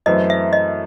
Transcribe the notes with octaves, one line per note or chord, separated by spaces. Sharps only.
F#2 E3 A3 C4 D#5
E5
D#5